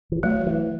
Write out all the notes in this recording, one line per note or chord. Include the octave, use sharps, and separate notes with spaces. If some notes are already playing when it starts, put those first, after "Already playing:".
E3
F#3 A3
E3